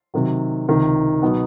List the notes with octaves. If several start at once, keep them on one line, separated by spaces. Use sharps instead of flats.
C3 D#3 F#3
C#2 C3 D#3
B2 F#3 B3 D#4